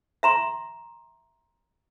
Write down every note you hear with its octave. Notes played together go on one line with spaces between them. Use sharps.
E5 A#5 C6